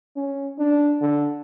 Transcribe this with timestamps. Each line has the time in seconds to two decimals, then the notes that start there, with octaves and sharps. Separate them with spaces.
0.16 C#4
0.59 D4
1.01 D3